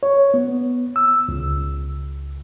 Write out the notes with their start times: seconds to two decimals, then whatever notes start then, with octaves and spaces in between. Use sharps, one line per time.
0.03 C#5
0.34 B3
0.96 E6
1.28 C#2